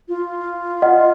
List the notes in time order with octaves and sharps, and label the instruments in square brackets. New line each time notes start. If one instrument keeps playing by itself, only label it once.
[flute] F4
[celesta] D#5 F#5